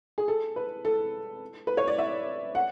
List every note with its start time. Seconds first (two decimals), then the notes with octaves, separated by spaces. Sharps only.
0.18 G#4
0.28 A4
0.56 B4
0.85 A4
1.67 B4
1.77 C#5
1.88 D5
1.98 E5
2.55 F#5